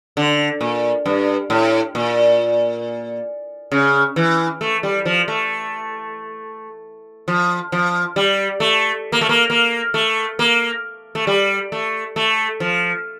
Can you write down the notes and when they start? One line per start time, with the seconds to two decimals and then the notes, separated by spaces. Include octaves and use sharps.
0.17 D3
0.61 A#2
1.06 G2
1.50 A2
1.95 A#2
3.72 C#3
4.16 E3
4.61 A3
4.83 G3
5.06 F3
5.28 A3
7.28 F3
7.72 F3
8.16 G3
8.60 A3
9.12 A#3
9.21 A3
9.29 A#3
9.50 A#3
9.94 A3
10.39 A#3
11.15 A3
11.27 G3
11.72 A3
12.16 A3
12.60 F3